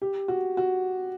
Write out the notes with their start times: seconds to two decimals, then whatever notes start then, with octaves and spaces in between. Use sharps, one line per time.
0.02 G4
0.28 F#4
0.57 F#4